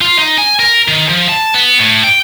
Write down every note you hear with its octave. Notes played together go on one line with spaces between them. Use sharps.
F4
D#4
G#5
A#4
D#3
F3
A5
B3
A2
G5